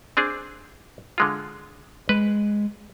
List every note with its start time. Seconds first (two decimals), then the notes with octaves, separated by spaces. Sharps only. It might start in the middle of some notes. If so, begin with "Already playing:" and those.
0.17 C4 D4 G#4
1.18 D3 G#3 F4
2.09 G#3 B4